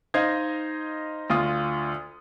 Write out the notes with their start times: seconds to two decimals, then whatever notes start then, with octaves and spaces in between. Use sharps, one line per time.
0.14 D#4 C5 D#5 F5 G#6 A#6
1.30 D2 F4 C6 D#6